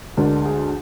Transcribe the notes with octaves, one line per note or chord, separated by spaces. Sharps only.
D2 D3 G#3 D4 A#4
G#4